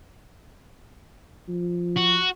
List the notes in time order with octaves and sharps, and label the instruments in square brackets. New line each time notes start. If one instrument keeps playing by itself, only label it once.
[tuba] F3
[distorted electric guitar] F#4